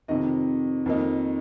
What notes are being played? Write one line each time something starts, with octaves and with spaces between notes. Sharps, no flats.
F2 C3 D#3 D#5
F2 D#3 A#3 D#4